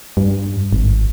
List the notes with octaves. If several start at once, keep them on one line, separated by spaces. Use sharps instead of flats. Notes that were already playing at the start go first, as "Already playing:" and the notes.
G2
G#1